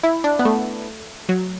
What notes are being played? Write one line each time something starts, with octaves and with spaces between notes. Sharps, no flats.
E4
D4
B3
A3
F#3